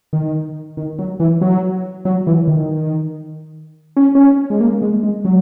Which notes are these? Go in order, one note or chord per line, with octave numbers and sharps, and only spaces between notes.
D#3
D#3
F#3
E3
F#3
F#3
E3
D#3
C#4
C#4
G#3
A#3
G#3
G#3
F#3